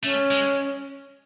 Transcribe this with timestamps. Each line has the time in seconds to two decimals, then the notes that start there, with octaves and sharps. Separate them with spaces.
0.03 A3 C#4
0.31 G#3